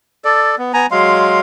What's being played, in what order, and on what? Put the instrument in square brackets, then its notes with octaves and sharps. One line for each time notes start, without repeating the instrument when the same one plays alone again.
[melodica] A4 D5
B3
B3 G#5 A#5
F#3 G#3 F5 C6